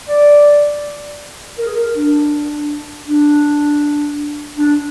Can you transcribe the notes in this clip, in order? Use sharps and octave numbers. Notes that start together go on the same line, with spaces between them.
D5
A#4
G#4
A#4
D4
D4
D4